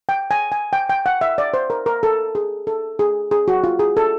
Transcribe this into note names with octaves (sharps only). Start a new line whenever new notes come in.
G5
G#5
G#5
G5
G5
F#5
E5
D5
C5
A#4
A#4
A4
G#4
A4
G#4
G#4
F#4
F4
G#4
A4